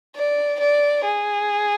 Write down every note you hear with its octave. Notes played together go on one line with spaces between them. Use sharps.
D5
D5
G#4